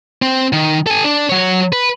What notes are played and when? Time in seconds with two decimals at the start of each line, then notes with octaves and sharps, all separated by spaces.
0.22 C4
0.53 D#3
0.87 A4 G#5
1.04 D4
1.30 F#3 C#5
1.73 B4